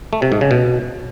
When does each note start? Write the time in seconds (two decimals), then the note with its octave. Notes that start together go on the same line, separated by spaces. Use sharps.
0.13 A3
0.22 C3
0.32 G#2
0.41 C#3
0.51 B2